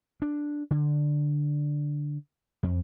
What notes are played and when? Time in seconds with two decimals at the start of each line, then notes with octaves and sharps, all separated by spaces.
0.22 D4
0.71 D3
2.63 F2